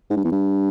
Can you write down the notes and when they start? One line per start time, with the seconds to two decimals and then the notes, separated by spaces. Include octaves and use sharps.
0.10 G#2
0.17 G2
0.25 E2
0.32 G2